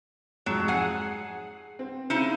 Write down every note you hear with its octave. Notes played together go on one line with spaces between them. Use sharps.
F2 G#2 F#3
G#4 F#5 C7
C4
C#3 D#4 E4